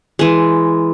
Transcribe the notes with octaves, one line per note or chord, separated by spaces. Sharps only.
E3 G#3